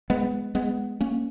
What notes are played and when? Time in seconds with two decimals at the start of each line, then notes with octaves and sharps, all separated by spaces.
0.10 G#3 B3
0.55 G#3 B3
1.01 A#3 C#4